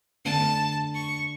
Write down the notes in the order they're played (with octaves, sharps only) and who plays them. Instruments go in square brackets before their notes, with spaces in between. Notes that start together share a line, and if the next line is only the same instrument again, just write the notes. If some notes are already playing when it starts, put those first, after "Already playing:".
[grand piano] D3 A3 D4 [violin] A5
[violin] C#6